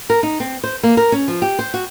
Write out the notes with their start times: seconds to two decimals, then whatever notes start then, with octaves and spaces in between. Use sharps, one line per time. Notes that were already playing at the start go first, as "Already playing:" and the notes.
0.10 A#4
0.23 D#4
0.40 C4
0.64 C5
0.83 A#3
0.97 A#4
1.12 C#4
1.28 F3
1.42 G4
1.59 C5
1.74 F#4